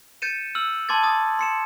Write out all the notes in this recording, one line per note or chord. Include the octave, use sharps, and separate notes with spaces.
G6 A6 C#7 D#7 E7
E6 F6 F#7
A5 C6 D6 G#6 A6
D#6 A6
C6 C#7 E7